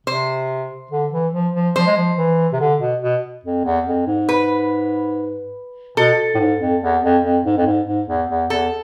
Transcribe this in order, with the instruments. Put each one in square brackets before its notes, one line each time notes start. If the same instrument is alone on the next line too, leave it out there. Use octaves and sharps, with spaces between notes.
[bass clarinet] C3 [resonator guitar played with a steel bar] C5
[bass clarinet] D3
E3
F3
F3
[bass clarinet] F3 [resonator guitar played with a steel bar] C5
[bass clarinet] G#3
F3
E3
C3
D3
B2
B2
F2
E2
F2
G#2
[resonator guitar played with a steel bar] B4
[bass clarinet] B2 [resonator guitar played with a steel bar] A4
[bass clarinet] A2
G#2
F2
E2
F2
F2
G#2
F2
G#2
G#2
E2
E2
[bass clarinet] E2 [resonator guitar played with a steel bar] A4